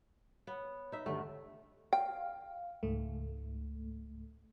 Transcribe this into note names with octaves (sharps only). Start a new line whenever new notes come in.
B3 C#5
D#4 E5
D2 G2 A3
F5 G5
C#2 G#2 A3